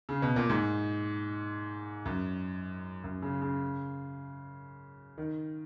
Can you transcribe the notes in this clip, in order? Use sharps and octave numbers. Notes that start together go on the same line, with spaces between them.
C#3
B2
A#2
G#2
F#2
F#2
C#3
C#3
D#3